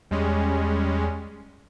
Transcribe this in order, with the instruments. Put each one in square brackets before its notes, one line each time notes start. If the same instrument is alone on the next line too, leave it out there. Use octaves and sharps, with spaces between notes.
[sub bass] E2 [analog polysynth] G3 G#3 C#4